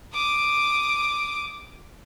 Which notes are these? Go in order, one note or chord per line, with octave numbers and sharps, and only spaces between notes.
D6 D#6